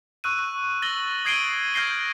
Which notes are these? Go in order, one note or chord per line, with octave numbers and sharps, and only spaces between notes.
C#6 E6 F#6 D#7
C#6
E6 A6 A#6 F#7 G7
D#6 G#6 C7 D7 D#7 G7
F6 G6 G#6 A#6 C7 G7